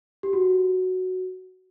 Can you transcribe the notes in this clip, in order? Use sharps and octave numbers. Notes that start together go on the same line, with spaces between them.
G4
F#4